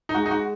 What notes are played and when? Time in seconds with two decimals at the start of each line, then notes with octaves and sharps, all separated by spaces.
0.09 D#4
0.14 G#3 F#4
0.26 D#4
0.31 F#4